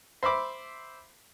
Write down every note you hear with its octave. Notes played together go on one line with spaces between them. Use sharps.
C5 E5 B5 D6